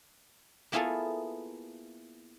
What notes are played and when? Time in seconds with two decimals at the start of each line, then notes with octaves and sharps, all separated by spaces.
0.72 A#3 B3 E4 F4 G#4 A4